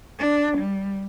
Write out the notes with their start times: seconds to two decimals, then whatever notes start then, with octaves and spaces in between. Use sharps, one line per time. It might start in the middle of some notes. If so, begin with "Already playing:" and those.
0.19 D4
0.58 G3